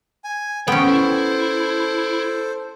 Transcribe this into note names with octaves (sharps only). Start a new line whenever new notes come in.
G#5
B3 C#4 A4 C5 G5
E4